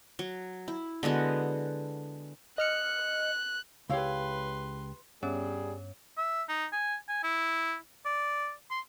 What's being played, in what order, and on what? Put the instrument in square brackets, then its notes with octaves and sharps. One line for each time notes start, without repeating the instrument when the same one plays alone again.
[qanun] F#3
E4
D3 G#3 B3 F#4
[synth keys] D#5 F6 C#7 [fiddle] F#6
[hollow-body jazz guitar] C#2 G4 [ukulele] E4 C#5 F5 [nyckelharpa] B4 C6
[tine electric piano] G2 [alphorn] G3 [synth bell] B3 C#4 C#5 [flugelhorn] G#4
[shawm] E5
D#4
G#5
G#5
E4
D5
C6